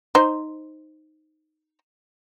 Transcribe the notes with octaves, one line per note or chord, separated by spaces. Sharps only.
D#4 C5